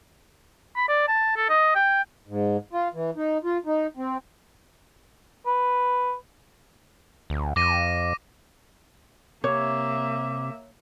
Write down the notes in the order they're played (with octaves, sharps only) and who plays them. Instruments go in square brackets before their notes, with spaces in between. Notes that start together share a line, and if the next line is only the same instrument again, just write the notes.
[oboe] B5
D5
A5
A4
D#5
G5
[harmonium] G#2
F4
E3
D#4
F4
D#4
C4
[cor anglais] B4
[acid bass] D2
[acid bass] F2 [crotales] D6 A#6 D#7
[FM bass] C3 [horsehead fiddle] A#3 E5 [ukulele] C#5 [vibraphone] D6